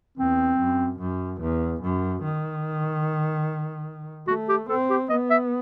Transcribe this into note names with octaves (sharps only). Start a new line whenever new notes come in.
E2 C4
F#2
F#2
E2
F#2
D#3
A3 F#4
G4
C4 A4
G4
B3 D#5
E5